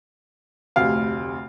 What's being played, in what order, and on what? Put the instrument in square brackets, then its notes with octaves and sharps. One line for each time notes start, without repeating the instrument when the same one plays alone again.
[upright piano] F1 D2 C3 [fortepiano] F5